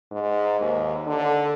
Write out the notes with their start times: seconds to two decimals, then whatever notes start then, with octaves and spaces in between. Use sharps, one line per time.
0.12 G#2
0.61 D#2
1.07 D3